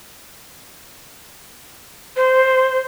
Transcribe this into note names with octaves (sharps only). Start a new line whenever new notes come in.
C5